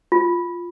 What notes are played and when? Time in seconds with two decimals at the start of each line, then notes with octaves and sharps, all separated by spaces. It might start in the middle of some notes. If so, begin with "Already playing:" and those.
0.12 F4